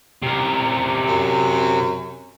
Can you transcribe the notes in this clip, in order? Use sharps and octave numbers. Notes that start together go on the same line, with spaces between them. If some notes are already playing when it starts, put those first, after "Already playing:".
C3 A#4
F#2